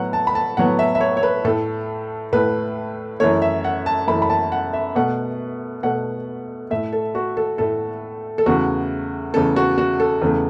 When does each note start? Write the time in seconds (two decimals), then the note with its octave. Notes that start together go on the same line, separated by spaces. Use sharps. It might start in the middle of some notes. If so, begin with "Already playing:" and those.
Already playing: A2 F#3 B3 F#5
0.13 A5
0.27 B5
0.35 A5
0.57 A2 F#3 B3 F#5
0.79 E5
0.95 E5
1.01 C#5
1.17 C#5
1.23 B4
1.45 A2 A3 A4
2.33 A2 A3 B4
3.20 F#2 E3 A3 C#5
3.42 E5
3.64 F#5
3.86 A5
4.07 F#2 E3 A3 B5
4.22 B5
4.30 A5
4.52 F#5
4.73 E5
4.95 B2 A3 F#5
5.83 B2 A3 F#5
6.70 A2 A3 E5
6.93 A4
7.15 F#4
7.37 A4
7.58 A2 A3 A4
8.38 A4
8.46 E2 C#3 A3 F#4
9.33 E2 C#3 A3 A4
9.56 F#4
9.78 F#4
10.00 A4
10.22 E2 C#3 A3